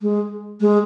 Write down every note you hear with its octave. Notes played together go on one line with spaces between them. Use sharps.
G#3
G#3